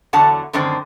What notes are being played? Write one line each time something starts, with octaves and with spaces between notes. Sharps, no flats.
E2 D3 F#3 F#5 A5
F#2 D3 D#3 G#3 C4